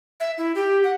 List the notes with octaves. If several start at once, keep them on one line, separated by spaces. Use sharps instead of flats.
E5
E4
G4
F#5